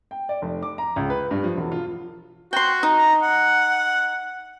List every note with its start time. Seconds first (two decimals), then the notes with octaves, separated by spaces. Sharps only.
0.11 G5
0.29 D5
0.42 F1
0.63 D6
0.78 A#5
0.96 C#2
1.10 B4
1.31 G2
1.44 F3
1.57 E1
1.72 F4
2.53 F#4 G5 C6
2.83 D#4
2.98 A#5
3.23 F#5